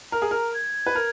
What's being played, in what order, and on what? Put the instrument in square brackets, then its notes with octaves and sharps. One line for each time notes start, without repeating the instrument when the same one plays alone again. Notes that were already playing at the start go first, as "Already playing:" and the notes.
[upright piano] A#4 [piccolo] A#5
[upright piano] G#4
A#4
[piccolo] G#6
[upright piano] B4
A#4